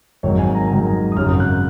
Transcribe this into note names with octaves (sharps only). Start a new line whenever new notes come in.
G#1 G#2 D#3 F#3 C#5
G#5
A#5
G#1 G#2 D#3 F#3
D#6
G#1 F#2 C#3 F6
F#6